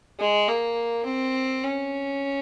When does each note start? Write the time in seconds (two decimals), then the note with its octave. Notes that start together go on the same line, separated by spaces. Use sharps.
0.20 G#3
0.48 A#3
1.05 C4
1.63 C#4